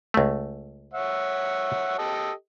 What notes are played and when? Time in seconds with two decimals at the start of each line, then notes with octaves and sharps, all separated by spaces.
0.14 C#2 A3
0.94 C#5 E5 F#5
1.98 G4 A4 D#5